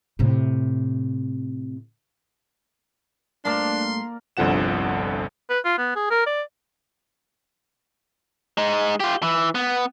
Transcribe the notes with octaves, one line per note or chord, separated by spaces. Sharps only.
A2 C3
G2 A3 A#3 D4 A#4 D5 F5 C6
G1 C2 D3 F3 F#5 E7
B4
F4
B3
G#4
A#4
D5
G#3 D#4
F4 G4
E3
B3